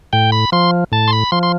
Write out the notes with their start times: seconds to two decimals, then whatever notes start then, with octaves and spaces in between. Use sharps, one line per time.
0.13 A2 G5
0.32 B5
0.52 F3 C6
0.92 A2 A5
1.08 C6
1.13 B5
1.32 F3 C6
1.43 C6